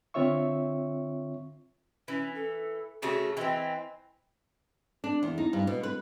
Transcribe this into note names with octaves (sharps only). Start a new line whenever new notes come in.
D3 C4 F4 C#5 E5 C#6
E3 C#4
A4
C#3 A3 F#4
E3 C4 D#5
D4
E2
D#4
G2
B2
B4